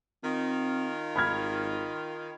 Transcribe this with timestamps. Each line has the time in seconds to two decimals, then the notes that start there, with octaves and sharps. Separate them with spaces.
0.24 D#3 C4 F4
1.16 G#1 B5 F6 G#6